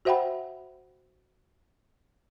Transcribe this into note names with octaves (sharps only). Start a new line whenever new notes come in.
F#4 C5 E5 F#5 G5 B5